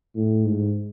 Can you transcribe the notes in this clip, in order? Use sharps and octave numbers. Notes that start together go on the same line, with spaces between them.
A2
G#2